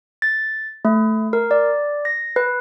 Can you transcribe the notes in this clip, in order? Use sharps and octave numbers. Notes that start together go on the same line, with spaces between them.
A6
A3
A#4
D5
A#6
B4